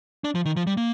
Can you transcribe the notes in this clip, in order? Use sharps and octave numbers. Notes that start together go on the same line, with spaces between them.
D4
F3
D#3
F3
G3
A#3